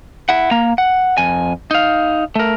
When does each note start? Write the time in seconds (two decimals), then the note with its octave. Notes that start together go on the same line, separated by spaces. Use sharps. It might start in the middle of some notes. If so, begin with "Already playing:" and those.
0.29 E4 F#5
0.51 A#3 A#5
0.78 F#5
1.18 F2 G#5
1.71 D#4 F5
2.36 A3 A#4